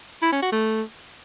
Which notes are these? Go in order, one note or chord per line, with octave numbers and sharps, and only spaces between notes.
E4
C#4
F#4
A3